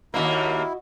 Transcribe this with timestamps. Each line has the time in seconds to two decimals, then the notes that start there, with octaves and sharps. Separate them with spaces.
0.14 D#2 G#2 A#3 E4 F#4 D#5 E5